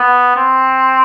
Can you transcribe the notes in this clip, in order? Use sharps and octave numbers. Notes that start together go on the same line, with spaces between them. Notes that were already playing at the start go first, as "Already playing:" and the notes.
Already playing: B3
C4